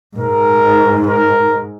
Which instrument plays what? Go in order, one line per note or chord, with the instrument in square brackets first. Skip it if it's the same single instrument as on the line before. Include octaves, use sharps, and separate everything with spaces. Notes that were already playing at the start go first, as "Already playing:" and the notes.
[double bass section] G#2 [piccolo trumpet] A#4
[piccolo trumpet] A#4